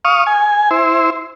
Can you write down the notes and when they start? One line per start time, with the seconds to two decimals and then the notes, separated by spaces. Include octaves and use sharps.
0.05 F5 C#6 D#6
0.27 G#5
0.71 E4 C5